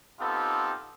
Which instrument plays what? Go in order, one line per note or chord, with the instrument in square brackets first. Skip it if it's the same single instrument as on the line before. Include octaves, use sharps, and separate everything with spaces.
[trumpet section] B3 C4 D#4 F4 G4 A4